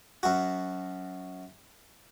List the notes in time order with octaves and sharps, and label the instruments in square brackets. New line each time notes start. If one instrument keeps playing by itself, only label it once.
[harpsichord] F#2 F#4